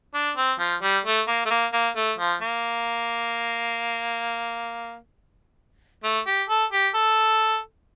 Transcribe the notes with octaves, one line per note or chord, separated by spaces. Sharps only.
D4
C4
F3
G3
A3
A#3
A3
A#3
A#3
A3
F3
A#3
A3
G4
A4
G4
A4